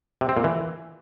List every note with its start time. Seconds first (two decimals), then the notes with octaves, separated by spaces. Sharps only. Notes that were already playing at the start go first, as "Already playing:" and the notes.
0.21 C3
0.29 C4
0.37 A#2
0.44 E3